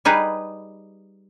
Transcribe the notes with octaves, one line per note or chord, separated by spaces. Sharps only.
G3 D#4 G#4 B4